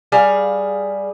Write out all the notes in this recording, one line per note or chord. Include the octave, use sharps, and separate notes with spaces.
G3 G#4 F5